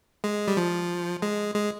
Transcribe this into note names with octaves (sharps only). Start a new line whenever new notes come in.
G#3
G3
F3
G#3
G#3